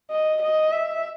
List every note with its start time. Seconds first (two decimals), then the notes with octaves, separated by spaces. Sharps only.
0.11 D#5
0.42 D#5
0.72 E5